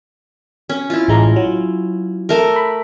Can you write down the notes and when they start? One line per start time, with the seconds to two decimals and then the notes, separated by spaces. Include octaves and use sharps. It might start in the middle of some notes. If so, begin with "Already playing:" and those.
0.70 C#4
0.90 E4 F4
1.08 A1 G#3 A#5
1.36 F#3
2.29 A3 A#4
2.56 B5